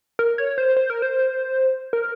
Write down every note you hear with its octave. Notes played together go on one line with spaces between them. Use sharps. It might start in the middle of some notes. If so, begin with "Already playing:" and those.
A#4
C#5
C5
C5
A#4
C5
A#4